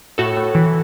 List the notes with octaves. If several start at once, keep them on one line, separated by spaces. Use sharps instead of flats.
A2 F#4 A4
A2
E3